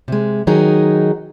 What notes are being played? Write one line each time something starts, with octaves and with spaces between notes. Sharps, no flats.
C3 G#3
D#3 F#3 D#4 G#4